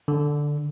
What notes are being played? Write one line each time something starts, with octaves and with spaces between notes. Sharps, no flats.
D3